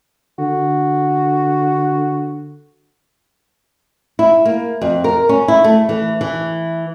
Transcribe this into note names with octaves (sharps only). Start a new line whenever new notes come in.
D3 F#4
E4
A#3
F2
A#4
C#4
E4
A3
E3
E3